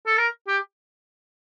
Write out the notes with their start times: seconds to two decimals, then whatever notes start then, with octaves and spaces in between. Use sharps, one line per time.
0.07 A4
0.18 A#4
0.48 G4